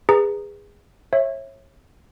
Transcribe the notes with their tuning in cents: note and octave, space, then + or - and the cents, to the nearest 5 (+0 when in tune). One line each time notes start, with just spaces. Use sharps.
G#4 -20 B4 +0 A#5 +0
C#5 -30 E5 +0